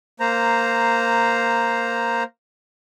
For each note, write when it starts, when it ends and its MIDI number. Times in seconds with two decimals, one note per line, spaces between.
0.20 2.23 58
0.20 2.23 72
0.20 2.23 82